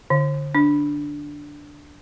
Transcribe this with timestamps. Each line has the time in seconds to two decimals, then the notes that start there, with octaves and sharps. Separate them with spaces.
0.10 D3
0.55 D4